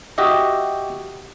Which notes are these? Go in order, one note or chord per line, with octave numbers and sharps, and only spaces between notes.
F#4 G4 D#5 E5